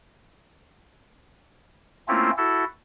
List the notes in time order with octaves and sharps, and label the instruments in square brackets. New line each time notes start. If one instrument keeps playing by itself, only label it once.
[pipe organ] A3 A#3 C4 C#4 E4 F4
E4 F#4 A4